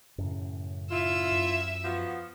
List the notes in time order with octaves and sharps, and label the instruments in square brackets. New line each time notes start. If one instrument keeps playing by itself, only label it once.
[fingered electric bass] F#2 A2 C#3
[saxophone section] E4 F4 [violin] E5 E6
[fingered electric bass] F#2
[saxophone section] F3 B3 F#4